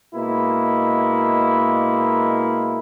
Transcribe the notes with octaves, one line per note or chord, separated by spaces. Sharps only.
B2 G#3 A#3 E4